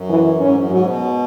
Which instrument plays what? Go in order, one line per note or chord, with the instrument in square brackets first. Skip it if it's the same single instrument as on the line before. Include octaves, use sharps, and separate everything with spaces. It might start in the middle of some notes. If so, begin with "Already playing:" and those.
Already playing: [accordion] F#2
[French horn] E3
[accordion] G#2 [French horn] C#4
[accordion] F#2
[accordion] G#2 [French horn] F#3
[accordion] B2